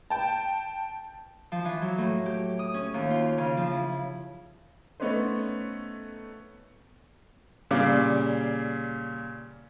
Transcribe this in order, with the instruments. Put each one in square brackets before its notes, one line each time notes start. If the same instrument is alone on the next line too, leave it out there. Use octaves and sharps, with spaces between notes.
[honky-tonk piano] G5 A5
[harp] F3
E3
F#3
A2
G4
D#6
C#4
D#2
F4
C#3
F3
E4
[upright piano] A3 B3 C#4 D#4 B4 C5
[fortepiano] A#2 C#3 G3 F5 D6